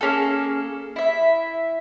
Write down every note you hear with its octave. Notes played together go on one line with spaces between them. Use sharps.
A#3 C#4 G#4 A4
E4 E5